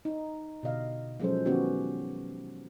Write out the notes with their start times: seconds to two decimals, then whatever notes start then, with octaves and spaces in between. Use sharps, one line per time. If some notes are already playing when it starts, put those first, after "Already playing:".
0.05 D#4
0.63 B2 D3 D#5 F5
1.20 F3 F#3 G#3 C#4 A4 C5
1.45 D#3 B3 C#4 F#4 G4